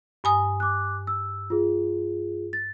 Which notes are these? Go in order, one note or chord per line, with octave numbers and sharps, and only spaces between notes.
G2 G#5 D#6
D6 F#6
E6
F4 G#4
A6